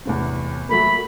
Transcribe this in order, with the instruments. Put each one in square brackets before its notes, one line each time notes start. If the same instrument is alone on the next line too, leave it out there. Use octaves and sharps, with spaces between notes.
[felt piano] E2 A2 C3
[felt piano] F#3 A3 A#3 [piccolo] B5